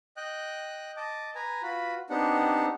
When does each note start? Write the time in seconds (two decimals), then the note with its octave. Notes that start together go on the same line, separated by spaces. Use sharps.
0.17 D#5 G5 F#6
0.97 D#5 A5 D6
1.35 B4 G#5 A#5
1.63 F4 F#4 B4 B5
2.10 B3 C4 D4 D#4 G4 F#5